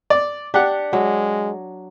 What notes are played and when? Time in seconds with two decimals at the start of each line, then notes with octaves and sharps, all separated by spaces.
0.10 D5
0.54 D4 G4 F#5
0.93 F#3 G#3